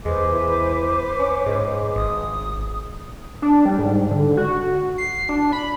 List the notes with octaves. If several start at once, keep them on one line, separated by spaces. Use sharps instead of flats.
E2 G#3 B4 C5 D6
E3
C#4
G#2 G#3
G#1 D#6
D4
G3
G#2
D3
F#4
C7
D4
B5